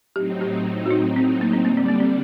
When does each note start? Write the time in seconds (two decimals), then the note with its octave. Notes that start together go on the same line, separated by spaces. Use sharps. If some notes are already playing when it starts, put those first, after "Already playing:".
0.15 A2 F#3 C4 D#4 G4
0.41 G4
0.86 F#4
0.91 D#4
1.16 C4
1.41 A#3
1.53 C4
1.65 D3 G3 A#3 D4
1.77 C4
1.89 A#3
2.00 C4